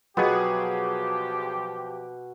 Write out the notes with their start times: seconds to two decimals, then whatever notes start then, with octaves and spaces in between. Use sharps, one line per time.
0.17 B2 F3 F#3 B3 F4 G4 G#4